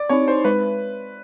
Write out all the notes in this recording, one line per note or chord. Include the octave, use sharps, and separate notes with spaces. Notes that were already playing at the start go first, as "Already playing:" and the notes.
Already playing: D5
C4 D#4 C#5
C5
G#3 B4